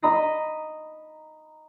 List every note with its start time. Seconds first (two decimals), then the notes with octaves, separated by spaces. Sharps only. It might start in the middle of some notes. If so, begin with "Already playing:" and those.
0.02 D#5 A#5 B5 D#6 A#6 C7